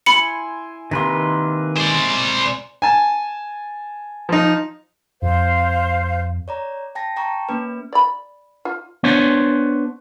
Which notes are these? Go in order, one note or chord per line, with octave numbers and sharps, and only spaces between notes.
E4 G#5 B5 C6 C#7
C3 D#3 A#3 B4 C6
G#3 C5 D5
G#5 A5
F3 D#4
F2 C5 F5
C#5 D5 A#5
G5 A5 A#6
G5 A5 A#5 C#6
A#3 C#4 B4
D5 B5
F4
B3 D4 C5 C#5